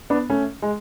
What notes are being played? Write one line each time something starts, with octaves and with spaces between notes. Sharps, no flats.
B3 D4
A3 C#4
G#3